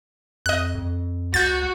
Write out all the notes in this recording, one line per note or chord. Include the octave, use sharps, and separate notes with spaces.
F2 D#5 F#6
F2
C#2 F#4 G6 A6